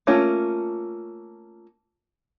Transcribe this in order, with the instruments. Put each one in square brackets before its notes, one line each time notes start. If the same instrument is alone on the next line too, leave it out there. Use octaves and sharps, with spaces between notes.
[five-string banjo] A3 A#3 C#4 F4